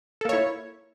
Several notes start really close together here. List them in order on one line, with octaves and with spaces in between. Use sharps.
A4 A#3 C#5 E4